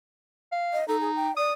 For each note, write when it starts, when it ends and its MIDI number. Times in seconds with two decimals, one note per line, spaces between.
0.52 0.80 77
0.73 0.87 75
0.88 1.29 63
0.88 0.99 69
1.01 1.11 68
1.16 1.35 79
1.36 1.53 74
1.36 1.52 87